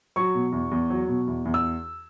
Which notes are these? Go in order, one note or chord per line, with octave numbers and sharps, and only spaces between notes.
F#3 C#6
B2
E2
E2
F#3
B2
E2
E2
E6